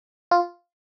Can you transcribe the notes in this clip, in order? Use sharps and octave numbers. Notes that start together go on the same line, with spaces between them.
F4